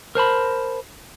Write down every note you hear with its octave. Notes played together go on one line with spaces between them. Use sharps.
A#4 C5 A5 B5